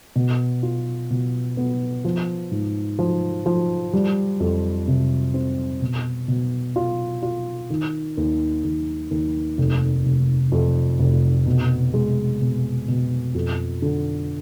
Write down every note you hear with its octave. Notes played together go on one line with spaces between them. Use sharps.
B2
F4
B2
B3
F3
G#2
F3
F3
G3
F2
C3
C4
B2
B2
F4
F4
D#3
D#2
D#2
D#2
F1
F1
F2
F1
B2
G#3
B2
B2
F2
D3